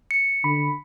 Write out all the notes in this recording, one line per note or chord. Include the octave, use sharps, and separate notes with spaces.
C#7
D3 B5